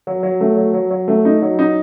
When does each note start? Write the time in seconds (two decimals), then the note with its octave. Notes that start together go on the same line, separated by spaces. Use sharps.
0.07 F#3
0.23 F#3
0.41 A3
0.57 F#3
0.74 F#3
0.91 F#3
1.08 A3
1.25 D#4
1.42 F#3
1.59 D#4